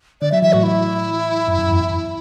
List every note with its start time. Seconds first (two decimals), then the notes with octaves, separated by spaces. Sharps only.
0.21 D3 D5
0.32 F#3 E5
0.42 E3 E5
0.53 A2 F#4
0.63 E4
1.48 F#2
1.58 F#2
1.69 E2
1.80 F#2
1.91 E2